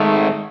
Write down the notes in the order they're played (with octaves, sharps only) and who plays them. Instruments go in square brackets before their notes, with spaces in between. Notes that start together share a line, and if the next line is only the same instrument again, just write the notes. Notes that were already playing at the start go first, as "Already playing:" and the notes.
Already playing: [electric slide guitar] G#2 D#3 G#3 [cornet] A3